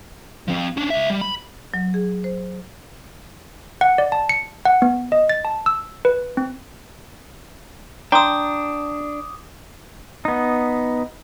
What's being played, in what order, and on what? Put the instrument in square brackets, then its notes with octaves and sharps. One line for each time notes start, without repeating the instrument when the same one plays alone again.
[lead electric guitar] F3 C4
C#4 D4
C#2 E5
G3
B5
[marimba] F#3
G#4
C5
[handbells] F#5
D5
A5
C#7
F#5
B3
D#5
A6
A5
E6
B4
C4
[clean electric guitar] D4 [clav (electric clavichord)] G5 [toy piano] A#5 C6 [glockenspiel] D6 D#6
[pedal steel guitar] B3 D#4